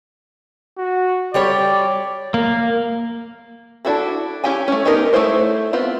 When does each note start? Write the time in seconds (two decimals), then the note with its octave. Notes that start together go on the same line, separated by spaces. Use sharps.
0.78 F#4
1.34 G3 G4 C#5 D5
2.34 A#3
3.85 D4 E4 F#4 A4 B4
4.44 C#4 E4 G4 G5 G#5
4.68 A3 C#4
4.85 B3 D4 D#4 G4 A#4
5.13 A3 A#3 E4 C5 C#5
5.73 B3 C4 F4